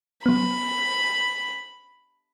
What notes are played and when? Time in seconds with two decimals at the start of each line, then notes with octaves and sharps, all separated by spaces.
0.26 F#3 B3 B5